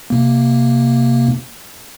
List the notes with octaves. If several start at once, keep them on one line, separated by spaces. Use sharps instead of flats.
C3 A#3